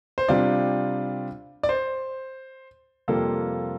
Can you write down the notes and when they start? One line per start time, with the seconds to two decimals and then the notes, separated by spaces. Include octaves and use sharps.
0.18 C5
0.28 C3 G3 D4 F4 D5
1.63 D5
1.69 C5
3.08 F2 C3 G3 A#3 F4 A4